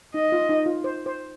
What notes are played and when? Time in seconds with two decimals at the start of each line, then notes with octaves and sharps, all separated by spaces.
0.14 D#4 D#5
0.32 F4
0.49 D#4
0.66 F4
0.84 C5
1.06 C5